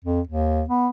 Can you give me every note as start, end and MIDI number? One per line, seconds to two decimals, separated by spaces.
0.05 0.21 41
0.27 0.63 39
0.69 0.88 59